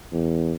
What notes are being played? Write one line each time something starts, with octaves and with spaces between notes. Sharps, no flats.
E2